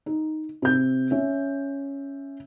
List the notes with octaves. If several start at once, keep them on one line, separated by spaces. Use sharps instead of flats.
D#4
C3 G6
C#4 E5